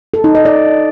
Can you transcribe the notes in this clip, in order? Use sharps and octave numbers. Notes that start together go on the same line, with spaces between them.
A4
D#4
D#5
D5